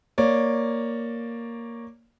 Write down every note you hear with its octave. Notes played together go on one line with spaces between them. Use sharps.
A#3 C#5 D5